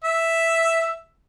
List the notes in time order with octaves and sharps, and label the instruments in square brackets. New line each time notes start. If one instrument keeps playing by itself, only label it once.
[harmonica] E5